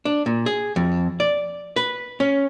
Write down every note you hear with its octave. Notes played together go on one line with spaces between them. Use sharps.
D4
A#2
G#4
F2
D5
B4
C#4